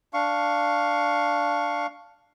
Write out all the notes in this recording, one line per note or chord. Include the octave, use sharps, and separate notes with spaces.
D4 F5 C#6